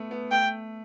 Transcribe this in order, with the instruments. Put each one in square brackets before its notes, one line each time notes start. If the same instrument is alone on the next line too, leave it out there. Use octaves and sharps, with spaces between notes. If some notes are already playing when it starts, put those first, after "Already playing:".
Already playing: [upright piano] A3 B3
B3
[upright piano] A3 [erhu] G5